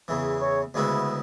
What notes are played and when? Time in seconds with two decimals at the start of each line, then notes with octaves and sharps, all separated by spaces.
0.08 E2 C#3 E3
0.41 C#5
0.74 D2 C#3 G#3 B3 E4